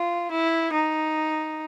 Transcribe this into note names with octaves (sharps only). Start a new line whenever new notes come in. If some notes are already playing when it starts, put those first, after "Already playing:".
Already playing: F4
E4
D#4